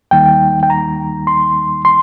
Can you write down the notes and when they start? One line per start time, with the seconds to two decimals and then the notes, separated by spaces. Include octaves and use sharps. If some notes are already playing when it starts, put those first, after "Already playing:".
0.11 D#2 D#3 G3 A#3 D#4 G5
0.63 G5
0.70 A#5
1.27 C6
1.85 C6